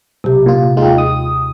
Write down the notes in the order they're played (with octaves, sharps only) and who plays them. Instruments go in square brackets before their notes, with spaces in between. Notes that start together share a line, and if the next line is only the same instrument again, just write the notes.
[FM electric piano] B1 [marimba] C3 G4
[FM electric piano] A#2 F4
[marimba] D#2 G5 [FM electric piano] G#3 D#4 F4
[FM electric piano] D#6